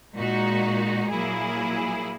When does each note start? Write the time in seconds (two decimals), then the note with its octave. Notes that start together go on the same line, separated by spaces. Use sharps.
0.16 A#2 G#3 D#4 F#4
1.10 A#2 F#3 A#3 E4 G#4